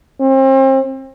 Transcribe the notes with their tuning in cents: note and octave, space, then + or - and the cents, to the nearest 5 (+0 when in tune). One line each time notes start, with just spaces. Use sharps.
C4 +35